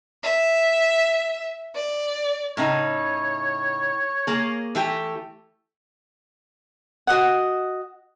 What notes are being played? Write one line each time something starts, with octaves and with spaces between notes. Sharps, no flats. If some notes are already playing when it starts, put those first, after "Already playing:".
E5
D5
A2 C#3 D#4 C#5
A#3 G#4
E3 A3 G4
F#4 D#5 F#5